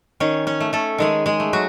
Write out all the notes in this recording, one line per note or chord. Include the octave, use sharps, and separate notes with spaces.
D#3 C#4 C#5
C#4 C#5
A3
A3 A4
D#3 G#3 G#4
G#3 G#4
A3
F#3 F#4